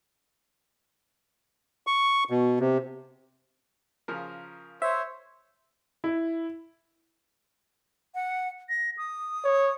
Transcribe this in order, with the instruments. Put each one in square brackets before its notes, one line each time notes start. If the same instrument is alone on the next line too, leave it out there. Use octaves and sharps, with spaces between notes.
[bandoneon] C#6
B2
C3
[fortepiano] C#3 F3 A#4
[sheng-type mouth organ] C5 C#5 [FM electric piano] E5
[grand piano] E4
[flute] F#5
A#6
D#6
[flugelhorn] C#5